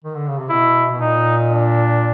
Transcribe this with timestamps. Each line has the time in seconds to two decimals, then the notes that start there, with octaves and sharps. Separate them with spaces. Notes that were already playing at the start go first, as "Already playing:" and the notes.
0.04 D#3
0.15 D3
0.28 C#3
0.39 C3
0.50 B2 E4
0.91 B2
1.00 A#2 D#4
1.51 D4